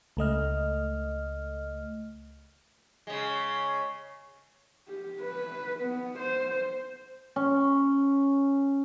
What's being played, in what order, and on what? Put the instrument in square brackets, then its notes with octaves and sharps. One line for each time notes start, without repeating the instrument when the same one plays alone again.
[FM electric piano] C#2 A3 D#5 F6
[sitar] C#3 G#3
[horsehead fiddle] G4
B4
B3
C5
[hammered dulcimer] C#4